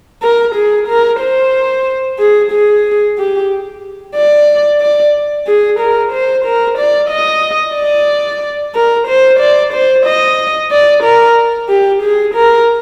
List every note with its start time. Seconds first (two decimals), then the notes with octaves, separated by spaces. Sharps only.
0.22 A#4
0.55 G#4
0.88 A#4
1.21 C5
2.19 G#4
2.52 G#4
3.18 G4
4.16 D5
4.81 D5
5.47 G#4
5.80 A#4
6.12 C5
6.45 A#4
6.78 D5
7.10 D#5
7.76 D5
8.74 A#4
9.08 C5
9.40 D5
9.73 C5
10.06 D#5
10.71 D5
11.04 A#4
11.69 G4
12.02 G#4
12.34 A#4